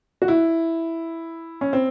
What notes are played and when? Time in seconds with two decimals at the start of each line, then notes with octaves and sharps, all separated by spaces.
0.22 F#4
0.28 E4
1.61 C#4
1.73 C4